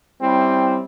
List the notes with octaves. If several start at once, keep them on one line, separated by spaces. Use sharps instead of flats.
G3 C4 C#4 E4